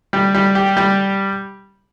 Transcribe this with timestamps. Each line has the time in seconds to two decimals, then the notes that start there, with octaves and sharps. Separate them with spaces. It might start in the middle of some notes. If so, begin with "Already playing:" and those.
0.13 G3
0.34 G3
0.55 G4
0.77 G3